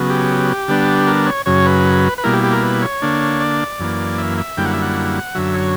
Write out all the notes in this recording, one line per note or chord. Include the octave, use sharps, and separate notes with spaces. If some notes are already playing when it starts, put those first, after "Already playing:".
Already playing: C#3 F#3 B3
G4
D3 G3 B3 D4
A#4
C#5
F#2 C#3 F#3 C#5
B4
B4
B2 G3 A#3 E4 A#4
G4
G4
A#4
B4
C#5
D3 A#3 D4
D5
F#2 E3 A#3
E5
E5
F#2 D3 G3 A#3 E4 G5
F#5
E5
F#5
F#2 D3 F#3 E5
C#5